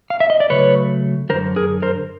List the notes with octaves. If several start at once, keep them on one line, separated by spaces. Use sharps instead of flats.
F5
E5
D#5
D5
C#3 F#3 A3 B4 C#5
F#2 D3 F#3 A#4 C5
G#4 A#4
A#4 C5